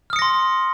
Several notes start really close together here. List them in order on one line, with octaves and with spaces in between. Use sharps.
F6 D#6 C#7 A#6 C6